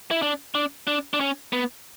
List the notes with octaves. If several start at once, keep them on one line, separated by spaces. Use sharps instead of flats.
E4
D4
D4
D4
D4
C#4
B3